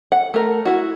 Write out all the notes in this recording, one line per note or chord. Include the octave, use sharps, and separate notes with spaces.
F#5
A3 A#4
E4 F#4